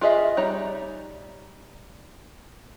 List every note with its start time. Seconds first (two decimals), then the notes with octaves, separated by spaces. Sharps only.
0.01 F4 G#4 D#5 E5
0.37 G3 D#4 C#5 D5 A#5